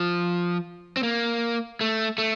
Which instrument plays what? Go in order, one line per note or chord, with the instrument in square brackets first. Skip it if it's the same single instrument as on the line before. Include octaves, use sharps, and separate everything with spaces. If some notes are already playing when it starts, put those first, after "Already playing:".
Already playing: [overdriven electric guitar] F3
C4
A#3
A3
A3